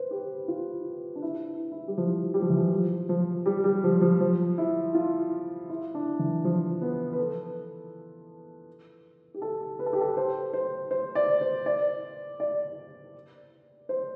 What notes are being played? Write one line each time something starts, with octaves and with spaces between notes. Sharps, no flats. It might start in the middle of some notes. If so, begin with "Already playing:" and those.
Already playing: B4 C5
G4
F4
D4
E4
E4
G3
F3
G3
F3
E3
F3
F3
F3
G3
G3
F3
F3
F3
E4
F4
E4
D4
E3
F3
B3
B4
A4
G4
A4
B4
A4
G4
A4
C5
C5
C5
D5
C5
D5
D5
C5